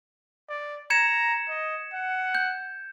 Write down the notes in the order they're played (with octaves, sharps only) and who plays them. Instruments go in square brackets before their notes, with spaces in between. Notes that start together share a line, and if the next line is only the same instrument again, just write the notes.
[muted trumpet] D5
[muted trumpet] A#5 [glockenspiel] G#6 C#7 E7
[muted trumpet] D#5
F#5
[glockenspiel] G6